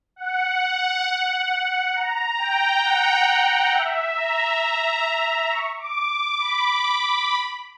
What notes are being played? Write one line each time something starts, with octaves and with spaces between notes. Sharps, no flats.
F#5
A#5
G5
F#5
F#5
F#5
E5
A#5
C#6
D6
D6
B5
B5